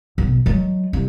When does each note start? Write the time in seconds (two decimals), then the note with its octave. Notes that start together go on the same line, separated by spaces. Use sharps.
0.18 B1
0.46 F#3 G#3
0.93 C2